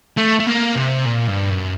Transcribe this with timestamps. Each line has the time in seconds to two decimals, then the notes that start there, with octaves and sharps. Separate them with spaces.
0.18 A3
0.40 A3
0.47 A#3
0.76 C3
1.06 A#2
1.27 G2
1.50 F#2